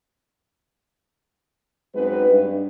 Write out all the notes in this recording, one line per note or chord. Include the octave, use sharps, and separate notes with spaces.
F#2 G#3 C4 D#4 B4
G2